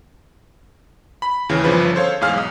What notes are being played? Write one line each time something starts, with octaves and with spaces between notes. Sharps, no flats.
B5
D#2 C#3 E3
G1 C#3 F3 B4
A4 C5 C#5 F5
E2 G#2 G#4 F5 F6
B1 D#6